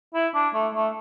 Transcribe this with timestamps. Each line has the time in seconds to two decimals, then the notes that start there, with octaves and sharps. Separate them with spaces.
0.14 E4
0.35 D4
0.54 A3
0.74 A3